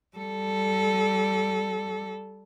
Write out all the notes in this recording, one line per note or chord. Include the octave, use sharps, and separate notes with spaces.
G3 A4